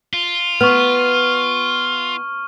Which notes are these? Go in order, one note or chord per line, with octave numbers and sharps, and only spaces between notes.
F4
B3 C#6 F6